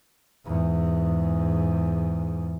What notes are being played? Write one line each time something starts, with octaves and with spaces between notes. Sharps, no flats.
E2 G#2